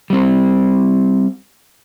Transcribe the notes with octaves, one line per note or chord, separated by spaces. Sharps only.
G3 C4